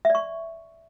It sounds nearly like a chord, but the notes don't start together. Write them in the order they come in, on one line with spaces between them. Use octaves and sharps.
E5 D5 C#6